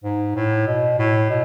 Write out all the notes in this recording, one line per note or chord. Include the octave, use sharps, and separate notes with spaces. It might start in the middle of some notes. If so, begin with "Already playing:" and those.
G#2
A2
B2
A2
B2